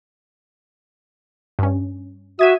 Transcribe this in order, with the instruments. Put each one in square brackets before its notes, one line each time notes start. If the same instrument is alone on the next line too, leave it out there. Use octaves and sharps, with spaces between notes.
[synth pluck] G2 C#4
[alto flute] F#4 [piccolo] E5 [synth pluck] D#6 G#6 D#7